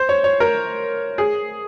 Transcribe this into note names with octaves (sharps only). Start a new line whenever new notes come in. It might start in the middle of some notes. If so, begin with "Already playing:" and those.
Already playing: C5
C#5
C#5
A#4
G#4